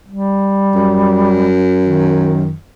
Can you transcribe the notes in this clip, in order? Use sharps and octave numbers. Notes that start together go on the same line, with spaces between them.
G3
F#2
D#3